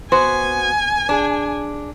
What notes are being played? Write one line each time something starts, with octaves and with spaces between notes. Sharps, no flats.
B3 F#4 C5 G#5
D4 G#4